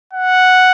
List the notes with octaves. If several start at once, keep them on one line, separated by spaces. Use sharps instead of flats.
F#5